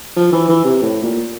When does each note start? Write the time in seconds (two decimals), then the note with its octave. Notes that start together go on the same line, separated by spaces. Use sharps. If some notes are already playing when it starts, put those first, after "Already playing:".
0.16 F3
0.32 E3
0.49 E3
0.65 C3
0.82 A2
1.03 A#2